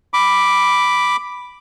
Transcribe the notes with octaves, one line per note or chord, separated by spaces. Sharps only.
B5 D6